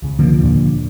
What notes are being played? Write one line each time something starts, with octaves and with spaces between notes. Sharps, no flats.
C#2 C#3
D3 F3 A#3
D#2 A#2